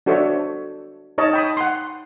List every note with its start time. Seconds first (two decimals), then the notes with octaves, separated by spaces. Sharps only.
0.06 D4 F#4 A4 C5 C#5 E5
1.18 D#4 C#5 D#5 A5
1.33 G5 B5 D#6
1.57 F#5 C6